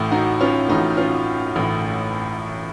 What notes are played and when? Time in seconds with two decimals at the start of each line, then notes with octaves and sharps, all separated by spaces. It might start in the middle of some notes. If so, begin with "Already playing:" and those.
Already playing: A1 A2
0.11 D#4 F#4
0.41 C#4 F4
0.68 A1 A2 D#4 F#4
0.97 C#4 F4
1.56 A1 A2